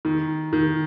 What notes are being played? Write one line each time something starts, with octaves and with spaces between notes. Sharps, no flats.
D#3
D#3